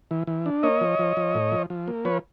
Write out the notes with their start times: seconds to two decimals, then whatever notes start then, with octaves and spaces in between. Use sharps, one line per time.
0.11 E3
0.27 E3
0.46 D4
0.63 A#3 C#5 D#5
0.81 F3
0.99 F3
1.17 F3
1.35 A2
1.52 F3
1.70 F3
1.88 A#3
2.05 F3 B4 C#5